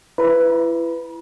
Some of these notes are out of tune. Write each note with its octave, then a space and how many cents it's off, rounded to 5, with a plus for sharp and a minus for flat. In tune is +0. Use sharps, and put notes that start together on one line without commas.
E4 +30 B4 +10 A#5 +45